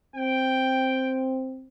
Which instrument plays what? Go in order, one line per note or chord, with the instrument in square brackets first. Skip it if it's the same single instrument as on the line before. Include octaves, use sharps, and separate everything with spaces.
[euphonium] C4 [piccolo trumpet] G5